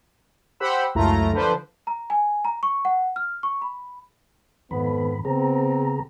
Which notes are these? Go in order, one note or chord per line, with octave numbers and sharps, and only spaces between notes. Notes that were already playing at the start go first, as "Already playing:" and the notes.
G4 C5 F#5 B5 E6
C#2 F#2 A3 E4 F4 A#5
D3 F3 D4 B4 C5
A#5
G#5
A#5
C#6
F#5
F6
C#6
B5
F2 G#2 D#3 B3 B5
C#3 B3 C4 G#4 A#5